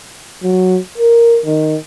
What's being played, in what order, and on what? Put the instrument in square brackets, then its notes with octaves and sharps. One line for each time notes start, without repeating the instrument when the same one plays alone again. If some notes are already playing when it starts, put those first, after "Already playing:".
[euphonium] F#3
A#4
D#3